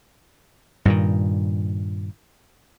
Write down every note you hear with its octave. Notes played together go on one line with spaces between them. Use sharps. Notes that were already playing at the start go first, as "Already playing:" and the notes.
G2 A#2 D#3